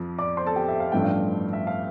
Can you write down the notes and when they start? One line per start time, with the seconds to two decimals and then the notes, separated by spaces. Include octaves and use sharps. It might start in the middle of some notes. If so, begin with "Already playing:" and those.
Already playing: F2 F3
0.19 D5 D6
0.37 C5 C6
0.46 A4 A5
0.56 G4 G5
0.68 E5
0.80 F5
0.92 A1 G2 F3 A3 D4 G5
1.04 F5
1.53 E5
1.67 F5